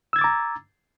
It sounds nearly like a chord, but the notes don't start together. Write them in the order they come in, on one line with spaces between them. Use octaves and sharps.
E6 G#6 A6 D6 A#5